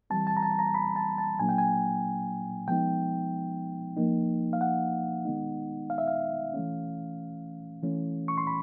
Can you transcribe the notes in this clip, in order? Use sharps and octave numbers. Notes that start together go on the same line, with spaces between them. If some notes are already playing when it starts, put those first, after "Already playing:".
E3 G3 C4 A5
A5
A#5
A5
A#5
B5
A5
A5
A#2 F#3 A#3 D4 G#5
G5
G#5
F3 G#3 B3 D#4 G5
F3 A#3 D#4
F5
F#5
D#3 G#3 B3 D#4
F5
E5
F5
E3 A3 C#4
E3 A3 C#4
C#6
C6
B5